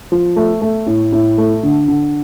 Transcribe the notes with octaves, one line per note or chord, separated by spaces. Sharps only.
F3
A3
A3
A2
A2
A3
D3
D3